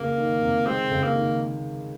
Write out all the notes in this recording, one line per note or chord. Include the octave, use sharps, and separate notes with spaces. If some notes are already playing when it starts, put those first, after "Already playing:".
Already playing: C#2 A#3
D#3
C3
G#3 C4
C#2
A#3
D#3